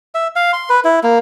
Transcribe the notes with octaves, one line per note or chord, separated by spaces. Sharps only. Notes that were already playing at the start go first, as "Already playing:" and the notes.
E5
F5
C6
B4
E4
A#3